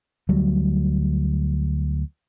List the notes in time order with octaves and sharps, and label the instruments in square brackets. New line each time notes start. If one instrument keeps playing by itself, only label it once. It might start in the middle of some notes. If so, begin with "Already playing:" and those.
[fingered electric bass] D2 F#3 G3